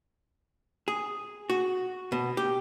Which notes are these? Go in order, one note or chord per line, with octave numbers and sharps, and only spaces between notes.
G#4
F#4
B2
G4